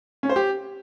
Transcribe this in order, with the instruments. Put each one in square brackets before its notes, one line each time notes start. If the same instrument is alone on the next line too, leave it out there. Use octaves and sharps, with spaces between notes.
[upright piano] C#4
C5
G4